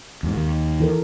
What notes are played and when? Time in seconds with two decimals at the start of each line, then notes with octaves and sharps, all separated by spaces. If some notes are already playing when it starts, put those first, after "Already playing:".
0.23 E2 G#2
0.36 D#2 D#3
0.80 E3 A4 A#4